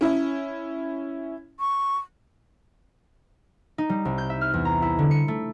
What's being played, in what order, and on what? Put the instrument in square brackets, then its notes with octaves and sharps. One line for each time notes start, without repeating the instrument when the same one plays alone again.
[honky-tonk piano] C#4 E4
[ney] C#6
[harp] D#4
G3
C2
G6
E5
F6
E2
A#5
E4
D3
C#7
A3